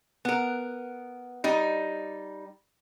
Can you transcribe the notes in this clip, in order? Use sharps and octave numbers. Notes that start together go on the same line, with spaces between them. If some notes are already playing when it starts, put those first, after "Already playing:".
B3 A#4
G3 D#4